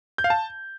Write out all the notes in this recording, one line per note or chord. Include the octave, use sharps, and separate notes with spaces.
G6
F5
A5